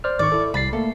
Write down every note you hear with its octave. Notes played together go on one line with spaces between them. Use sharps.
C5 D5 F6
G#1 D#3 D5 C#6
E4 A4
C2 B5 A6 C7
A3 A#3 A4